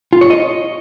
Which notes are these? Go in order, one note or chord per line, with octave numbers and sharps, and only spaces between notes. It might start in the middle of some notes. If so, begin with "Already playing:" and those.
F4
C#5
D#5